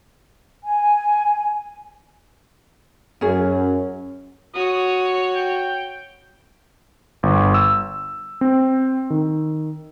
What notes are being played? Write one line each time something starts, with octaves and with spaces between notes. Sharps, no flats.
G#5
F#2 C#4 G#4
F#4 C#5 D#6
G5
G1
E6
C4
D#3